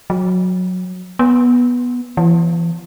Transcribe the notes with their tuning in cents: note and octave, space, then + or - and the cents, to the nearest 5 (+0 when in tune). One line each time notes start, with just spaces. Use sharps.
F#3 -15
B3 -10
E3 +40